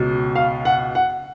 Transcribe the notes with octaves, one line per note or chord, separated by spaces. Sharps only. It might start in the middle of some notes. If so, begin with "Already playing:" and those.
Already playing: C#2 B2
F5
F#5
F#5